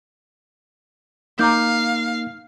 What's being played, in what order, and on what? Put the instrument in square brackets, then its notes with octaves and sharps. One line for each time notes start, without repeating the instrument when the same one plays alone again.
[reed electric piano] A#3 D#4 [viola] F5 [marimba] A#5 D6 G6